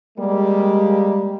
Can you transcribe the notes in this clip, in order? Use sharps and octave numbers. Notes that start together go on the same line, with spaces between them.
G3 G#3 A#3